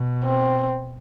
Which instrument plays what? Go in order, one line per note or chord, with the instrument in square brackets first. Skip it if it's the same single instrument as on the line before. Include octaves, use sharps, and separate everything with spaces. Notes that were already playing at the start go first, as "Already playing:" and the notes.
Already playing: [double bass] B2
[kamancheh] C4